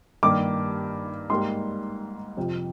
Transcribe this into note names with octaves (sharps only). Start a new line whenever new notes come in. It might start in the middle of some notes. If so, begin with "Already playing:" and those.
G2 D#3 A#3 D6
G#2 G3 A#3 C6
F2 C3 F3